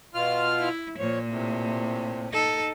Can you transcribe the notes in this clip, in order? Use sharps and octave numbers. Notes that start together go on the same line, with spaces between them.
B2 F4 F6
E4
A#2 F3 C#5
A2 C3
D#4 A4